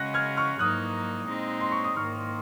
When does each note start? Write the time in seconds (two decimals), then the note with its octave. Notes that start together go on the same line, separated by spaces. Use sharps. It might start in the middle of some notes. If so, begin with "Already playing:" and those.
Already playing: C#3 G#3 C#4 F#4 F#6 A#6
0.14 F6 G#6
0.37 C#6 F6
0.59 G#2 F#3 A#3 D#4 D#6 F#6
1.28 A#2 G#3 C4 D#4
1.60 C6
1.72 C#6
1.84 D#6
1.97 G#2 D#3 A#3 C#6 F6